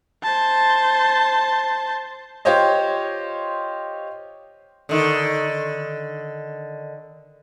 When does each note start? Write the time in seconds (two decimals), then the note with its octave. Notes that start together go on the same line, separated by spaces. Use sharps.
0.24 C5 A5
2.45 F4 G4 C5 C#5 D#5
4.89 D3 D#3